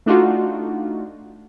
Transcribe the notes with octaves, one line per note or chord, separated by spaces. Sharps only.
A3 D4 D#4 F4 F#4